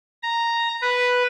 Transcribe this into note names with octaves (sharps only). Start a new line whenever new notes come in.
A#5
B4